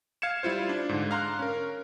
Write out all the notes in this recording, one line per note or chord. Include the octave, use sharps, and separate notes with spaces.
F5 G#6 C#7 E7
G3 E4 F4 C5
D4
G#2 D3
F5 A#5 C6 F#6
C#4 A#4